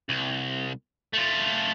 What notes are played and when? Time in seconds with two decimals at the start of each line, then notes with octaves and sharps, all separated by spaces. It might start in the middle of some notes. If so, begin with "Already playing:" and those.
0.09 C2
1.13 A3 F4